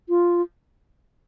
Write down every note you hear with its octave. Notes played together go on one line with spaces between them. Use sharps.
F4